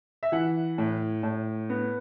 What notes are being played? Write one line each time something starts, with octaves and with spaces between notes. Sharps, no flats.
E5
E3 F#5
A2
A2
B3